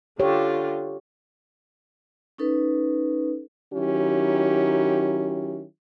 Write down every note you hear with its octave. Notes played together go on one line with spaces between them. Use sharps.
D3 F4 G4 C#5
C#4 D#4 A4 B4
D#3 F#3 C#4 E4 G4